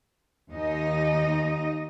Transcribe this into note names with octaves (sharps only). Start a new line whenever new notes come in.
D#2 D#4 D#5